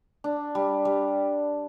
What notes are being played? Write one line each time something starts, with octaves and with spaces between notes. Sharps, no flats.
D4
G3
G3